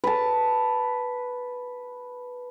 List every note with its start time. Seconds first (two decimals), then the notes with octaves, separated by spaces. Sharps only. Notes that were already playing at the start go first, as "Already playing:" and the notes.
0.04 B4 A5